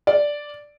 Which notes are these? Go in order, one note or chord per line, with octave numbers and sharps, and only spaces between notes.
D5